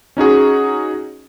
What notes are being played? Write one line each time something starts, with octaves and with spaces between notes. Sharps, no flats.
C#4 D#4 F#4 G#4